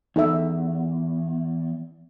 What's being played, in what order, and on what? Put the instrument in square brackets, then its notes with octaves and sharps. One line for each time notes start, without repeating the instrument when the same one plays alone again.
[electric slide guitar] E2 [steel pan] D#4 A4 E5